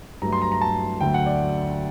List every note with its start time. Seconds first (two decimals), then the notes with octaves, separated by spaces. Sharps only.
0.22 G2 F#3 A3 A#5
0.32 C6
0.42 A#5
0.52 A#5
0.61 A5
1.01 D2 D3 F#3 A3 G5
1.14 F#5
1.26 D5